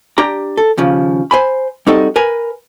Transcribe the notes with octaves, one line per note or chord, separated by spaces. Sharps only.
D4 G4 A#5
A4
D#2 C#3 F3
C5 G#5 B5
G3 C4 D#4 F#4 A4 D#5
A#4 B4 G#5